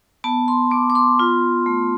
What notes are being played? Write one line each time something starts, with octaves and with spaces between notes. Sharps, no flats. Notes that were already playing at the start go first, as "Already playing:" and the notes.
B3 A5
C6
B3 D6
D6
C6
F4
A3